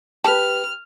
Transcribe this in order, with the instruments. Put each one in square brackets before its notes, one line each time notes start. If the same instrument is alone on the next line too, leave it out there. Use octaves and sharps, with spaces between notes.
[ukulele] G4 B4 [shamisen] A5 [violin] F6